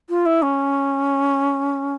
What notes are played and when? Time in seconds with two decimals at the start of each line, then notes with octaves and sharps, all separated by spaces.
0.09 F4
0.26 E4
0.42 C#4